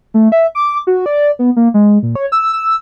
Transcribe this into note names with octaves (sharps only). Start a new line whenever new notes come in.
A3
E5
D6
F#4
D5
B3
A#3
G#3
A#2
C#5
E6
E6